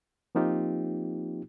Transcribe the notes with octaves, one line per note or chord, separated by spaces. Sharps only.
F3 A#3 C4 D#4 F4 G4